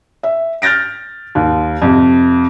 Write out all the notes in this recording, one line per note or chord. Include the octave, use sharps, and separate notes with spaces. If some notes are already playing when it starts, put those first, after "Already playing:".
E5
F6 G6 A6 A#6 D7
D#2
F2 C3